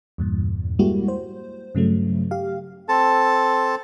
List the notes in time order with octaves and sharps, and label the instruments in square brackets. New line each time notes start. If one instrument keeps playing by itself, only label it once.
[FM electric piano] E2 G2 A#2
G3 G#3 A#3 E4 F#4 G4
C5
G2 C#3 F#3 A3
G4 F5
[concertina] C4 A4 A5